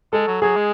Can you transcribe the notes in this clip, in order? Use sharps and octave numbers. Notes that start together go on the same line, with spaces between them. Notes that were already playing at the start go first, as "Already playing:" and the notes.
G#3 A4
F#3
F#3 G#4
G#3